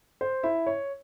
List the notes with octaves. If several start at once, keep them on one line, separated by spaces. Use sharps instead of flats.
C5
E4 E5
C#5